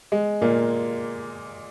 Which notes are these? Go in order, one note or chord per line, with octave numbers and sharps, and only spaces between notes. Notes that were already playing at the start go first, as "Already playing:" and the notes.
G#3
A#2 A#3